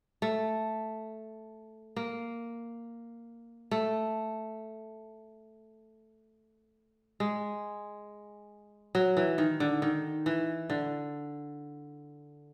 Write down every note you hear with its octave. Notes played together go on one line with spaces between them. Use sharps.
A3
A#3
A3
G#3
F#3
E3
D#3
D3
D#3
E3
D3